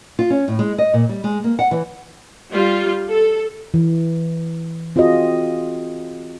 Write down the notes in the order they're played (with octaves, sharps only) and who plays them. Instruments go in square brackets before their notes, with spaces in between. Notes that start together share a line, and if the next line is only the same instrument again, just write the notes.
[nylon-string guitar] F4
C#4
A2
G#3
D#5
A#2
G3
G#3
A#3
F#5
E3
[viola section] G3 F4
A4
[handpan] E3
C4 F4 F#4 G#4 D#5